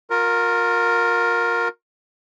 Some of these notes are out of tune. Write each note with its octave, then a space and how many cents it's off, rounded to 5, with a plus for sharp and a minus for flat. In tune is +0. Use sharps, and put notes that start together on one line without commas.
F4 +40 A#4 +0